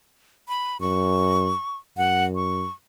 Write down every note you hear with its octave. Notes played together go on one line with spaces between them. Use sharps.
B5
F#2 C#6
F#2 F#5
C#6